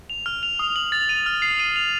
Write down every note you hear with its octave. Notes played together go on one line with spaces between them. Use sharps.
F7
F6
F7
D#6
F#7
A6
D#7
F6
C7
D#7
F7